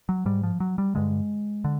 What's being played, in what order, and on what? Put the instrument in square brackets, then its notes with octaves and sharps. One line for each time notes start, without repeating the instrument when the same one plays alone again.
[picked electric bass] F#3
G#2 G3
F3
F#3
G3
G2 D3 G#3
D3